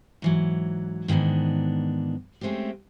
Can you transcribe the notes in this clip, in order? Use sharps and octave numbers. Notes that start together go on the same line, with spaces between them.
G#2 E3 F#3
G#2 D#3 E3 B3 D4
G#3 A3 C4 C#4 G4